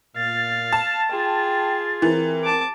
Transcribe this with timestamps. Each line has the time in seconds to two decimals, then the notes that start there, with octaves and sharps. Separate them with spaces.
0.16 A#2 F5 A6
0.73 A5
1.11 F4 G#4 G5
2.02 E3 C4 A#4
2.44 A5 D6